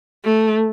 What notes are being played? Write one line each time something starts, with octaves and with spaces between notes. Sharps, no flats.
A3